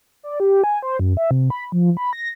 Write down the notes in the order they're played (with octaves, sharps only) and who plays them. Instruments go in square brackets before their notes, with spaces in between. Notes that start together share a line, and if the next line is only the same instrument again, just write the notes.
[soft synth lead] D5
G4
G#5
C5
F#2
E5
C3
B5
F3
B5
A#6